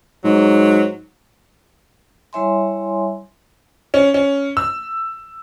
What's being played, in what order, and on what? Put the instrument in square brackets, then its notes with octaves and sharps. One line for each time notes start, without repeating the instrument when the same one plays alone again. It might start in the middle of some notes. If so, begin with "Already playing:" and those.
[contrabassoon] G#2 [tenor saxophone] F#3
[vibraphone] G3 E4 C#5 E5 G#5 C6
[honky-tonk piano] C#4
C#4
E6